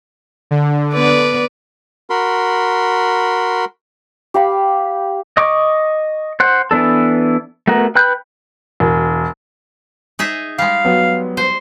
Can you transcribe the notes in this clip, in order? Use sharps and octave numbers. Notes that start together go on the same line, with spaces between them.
D3
B3 B4 D5
F#4 A#4 B5 C6
G4 F5 B5
D#5 C#6 D6
C5 F#5
E3 B3 D4 A4
A3 B3 F#4 A#4
B4 G5 B5 F#6 G6
E1
D#4 G#4 E5
G3 G#3 F5
F#3 B3
C5